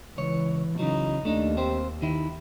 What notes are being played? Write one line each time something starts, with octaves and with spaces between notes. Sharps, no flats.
C#2 E3 C#5
C#3 E3 F#3 D#4
D#2 A3 D4 D#4
C4 G4 C5
D#3 E4